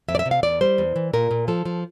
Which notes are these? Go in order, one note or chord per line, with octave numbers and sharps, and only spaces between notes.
F2 E5
D5
E5
C3
F5
E2 D5
G3 C5
E2
E3
A#2 A#4
A#2
F3 A4
F3